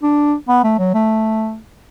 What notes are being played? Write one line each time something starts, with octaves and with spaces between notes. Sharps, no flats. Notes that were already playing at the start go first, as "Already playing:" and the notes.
D4
B3
A3
F#3
A3